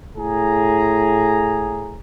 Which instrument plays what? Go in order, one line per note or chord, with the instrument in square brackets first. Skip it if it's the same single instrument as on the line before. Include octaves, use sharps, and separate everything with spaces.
[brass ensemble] A2 G#4 A#5